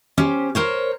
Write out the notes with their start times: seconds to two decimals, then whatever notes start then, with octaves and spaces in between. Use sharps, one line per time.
0.17 C#4 G4 C5
0.55 A#4 C5 C#5